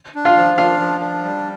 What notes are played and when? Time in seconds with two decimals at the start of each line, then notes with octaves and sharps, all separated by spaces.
0.15 D4
0.25 F4 F5
0.37 F3
0.57 D4 F4 F5
0.80 F3
1.00 D4
1.23 G3